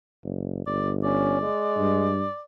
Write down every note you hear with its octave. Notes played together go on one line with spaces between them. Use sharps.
F#1
G1 D5
C#4 D5
G#3
G2